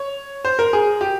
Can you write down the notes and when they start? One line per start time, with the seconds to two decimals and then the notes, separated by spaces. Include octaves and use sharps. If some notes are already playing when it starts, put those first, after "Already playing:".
Already playing: C#5
0.45 C5
0.59 A#4
0.73 G#4
1.01 G4